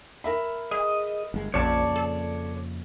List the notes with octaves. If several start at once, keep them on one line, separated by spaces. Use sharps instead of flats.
A#4 E5 B5
G#4 D#5
G1 G#3
A#1 F2 A#2 C#3 C#5 D5 A5
A4